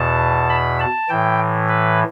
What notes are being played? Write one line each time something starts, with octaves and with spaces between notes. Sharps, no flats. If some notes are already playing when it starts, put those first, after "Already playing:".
Already playing: E2 B2 A5
B5
A5
A2 E3 G5
B4